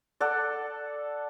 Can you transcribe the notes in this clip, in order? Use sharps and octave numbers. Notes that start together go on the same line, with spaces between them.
A4 D5 F#5